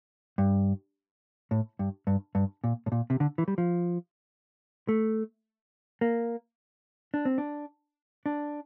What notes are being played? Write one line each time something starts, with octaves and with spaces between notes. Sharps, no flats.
G2
A2
G2
G2
G2
A#2
A2
A#2
C3
D3
E3
G3
F3
A3
A#3
D4
C4
D4
D4